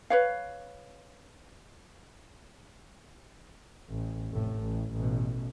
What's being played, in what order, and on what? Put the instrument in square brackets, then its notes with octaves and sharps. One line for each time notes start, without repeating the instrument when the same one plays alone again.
[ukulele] B4 C#5 F5
[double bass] A1
F1 A2
A1
A1 B2